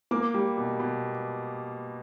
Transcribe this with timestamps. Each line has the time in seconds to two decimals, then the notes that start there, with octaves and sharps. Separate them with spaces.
0.11 A#3 D6
0.34 G3
0.57 B2
0.80 B2